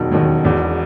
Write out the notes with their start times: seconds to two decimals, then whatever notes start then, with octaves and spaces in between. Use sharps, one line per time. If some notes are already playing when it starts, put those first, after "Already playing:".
Already playing: E1 D#2 D#3 F#3
0.11 E1 D#2 D#3 F#3
0.44 E1 E2 B2